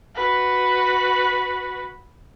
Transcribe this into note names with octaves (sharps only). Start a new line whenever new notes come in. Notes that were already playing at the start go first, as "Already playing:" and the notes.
F#4 B4